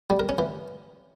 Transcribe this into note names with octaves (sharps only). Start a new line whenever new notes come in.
G3
A#4
C#4
E3